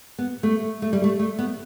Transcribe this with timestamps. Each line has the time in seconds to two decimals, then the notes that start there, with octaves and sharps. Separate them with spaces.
0.18 B3
0.43 A3
0.82 A3
0.93 G3
1.04 A3
1.19 A3
1.39 B3